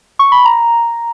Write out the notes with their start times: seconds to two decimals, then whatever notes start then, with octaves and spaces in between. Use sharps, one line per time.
0.19 C#6
0.32 B5
0.45 A#5